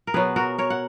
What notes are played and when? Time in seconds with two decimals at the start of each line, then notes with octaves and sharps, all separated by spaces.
0.07 A#4
0.14 B2 F#3 B3 G#4 B4
0.36 F#4 A#4
0.58 A#4 C#5
0.70 F#5